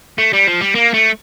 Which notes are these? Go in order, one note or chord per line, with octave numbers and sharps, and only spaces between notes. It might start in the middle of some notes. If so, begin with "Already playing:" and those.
A3
G3
F3
G3
A#3
A3